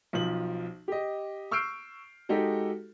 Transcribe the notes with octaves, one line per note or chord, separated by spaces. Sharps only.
B1 F3 F#7
G4 D#5
C#6 E6 F6 G6 C7 D7
G#3 D#4 F#4 G4 A4